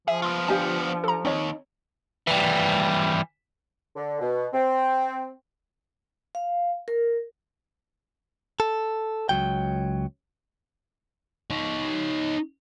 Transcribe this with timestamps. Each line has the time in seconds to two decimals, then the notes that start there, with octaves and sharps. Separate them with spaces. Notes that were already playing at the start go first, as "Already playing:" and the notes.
0.08 F3 G#4 E5
0.22 B3 F4 C6 D#6
0.48 D4 G4 F5 G#5
1.04 A4 A#5
1.25 D#2 C4 D#4 C#5
2.27 E3 G3
3.95 D3
4.20 B2
4.52 C4
6.35 F5
6.88 A#4
8.60 A4
9.29 C#2 F#3 G5
11.51 D#4 C#5